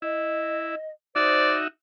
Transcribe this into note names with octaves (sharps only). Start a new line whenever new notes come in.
E4 D#5
D#4 F#4 C5 D5 E5